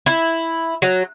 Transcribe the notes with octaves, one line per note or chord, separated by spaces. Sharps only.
E4
F#3